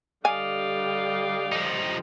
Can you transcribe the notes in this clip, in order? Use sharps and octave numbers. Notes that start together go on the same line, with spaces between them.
D3 G3 D5 D#5 F5 G5 G#5
F3 D#4